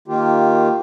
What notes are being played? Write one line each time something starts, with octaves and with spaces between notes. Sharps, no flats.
D#3 A#3 F4 G4